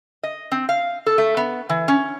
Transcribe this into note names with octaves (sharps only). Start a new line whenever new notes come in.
D#5
C4
F5
A4
A3
B3
E3
C#4